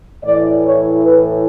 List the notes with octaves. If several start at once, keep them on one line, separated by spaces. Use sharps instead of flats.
A2 E3 D5
C#5
B4